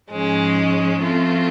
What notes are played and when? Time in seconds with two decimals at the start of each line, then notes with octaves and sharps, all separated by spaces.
0.11 G#2 F3 G#3 C#4
1.02 F3 A3 C4 F4